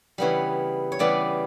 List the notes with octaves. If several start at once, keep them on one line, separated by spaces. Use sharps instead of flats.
C#3 E3 G3 B3 C#5
C#5
C#3 E3 G3 B3 D5